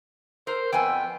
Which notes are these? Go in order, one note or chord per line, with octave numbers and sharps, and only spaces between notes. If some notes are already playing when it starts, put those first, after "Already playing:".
A#4 C5
F2 B3 G5 G#5